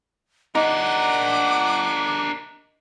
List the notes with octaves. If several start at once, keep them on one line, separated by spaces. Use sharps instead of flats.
D4 D#4 A#4 F#5 D6